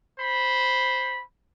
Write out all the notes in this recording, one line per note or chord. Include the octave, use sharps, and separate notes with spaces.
C5 B5